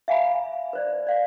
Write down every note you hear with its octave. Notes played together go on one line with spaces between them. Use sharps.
E5 F5 G#5 A#5 B5
B4 C5 D5
D5 F5